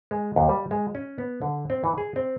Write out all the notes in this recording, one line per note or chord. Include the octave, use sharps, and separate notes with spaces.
G#3
D#2
G3
G#3
C#4
B3
D3
C4
E3
G#4
C4